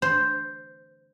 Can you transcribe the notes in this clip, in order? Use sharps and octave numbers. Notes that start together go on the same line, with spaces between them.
C5